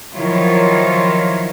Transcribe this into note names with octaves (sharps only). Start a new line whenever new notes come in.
D#3 F3 F#3 E4 F4 C#5